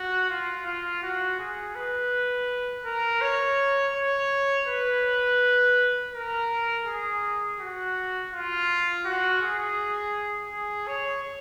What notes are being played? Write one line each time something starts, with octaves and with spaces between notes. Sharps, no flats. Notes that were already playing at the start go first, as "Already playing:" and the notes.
Already playing: F#4
F4
F4
F#4
G#4
B4
A#4
C#5
C#5
B4
A#4
G#4
F#4
F4
F#4
G#4
G#4
C#5